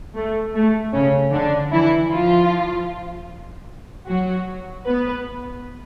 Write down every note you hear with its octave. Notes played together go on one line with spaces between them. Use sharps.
A3
A3
C#3 C#4
D3 D4
E3 E4
F3 F4
F#3 F#4
B3 B4